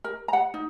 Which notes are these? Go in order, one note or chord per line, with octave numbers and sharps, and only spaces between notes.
A#4
A#5
F#5
D#4